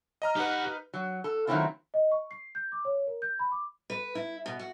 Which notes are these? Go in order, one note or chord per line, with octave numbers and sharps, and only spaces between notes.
D#5 A#5 F6
D#4 G4 B4 F#5
F#3
A4
D#3 F#3 A3 C4 E4 F4
D#5
C#6
C7
G6
D6
C#5
A#4
G6
B5
D6
B4
E4
B2
F#4